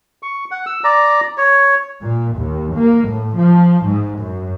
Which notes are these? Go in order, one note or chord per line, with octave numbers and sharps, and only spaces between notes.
C#6
F#5
E6
D5 A#5
C#5
A#2
D#2
A#3
A2
F3
G#2
F#2